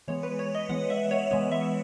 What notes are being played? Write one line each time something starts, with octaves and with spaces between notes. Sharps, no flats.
E3 G#3 B3 C#5
B4
C#5
D#5
E3 G#3 B3 F#5
E5
C#5
E3 G#3 B3 C#5
E5